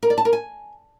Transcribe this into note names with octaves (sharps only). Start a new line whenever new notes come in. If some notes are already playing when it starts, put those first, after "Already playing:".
A#4
D5
A5
A#4
G#5